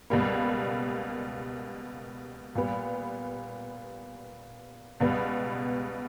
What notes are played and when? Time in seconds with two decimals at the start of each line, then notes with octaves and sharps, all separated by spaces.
0.10 C#2 B2 G3 A#3
2.55 A#2 G3 B3
5.00 C#2 B2 G3 B3